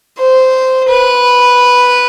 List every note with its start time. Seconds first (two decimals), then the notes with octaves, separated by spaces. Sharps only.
0.19 C5
0.89 B4